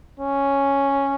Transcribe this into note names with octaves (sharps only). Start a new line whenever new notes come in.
C#4